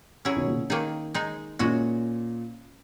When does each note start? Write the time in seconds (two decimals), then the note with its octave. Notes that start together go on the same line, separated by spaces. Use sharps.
0.25 F#3 C#4 E4 G#4
0.36 B2 D#3
0.47 A#2 C#3
0.70 D#3 A#3 D#4 G#4
1.14 G#3 D#4 G#4
1.59 A#2 G#3 C#4 F#4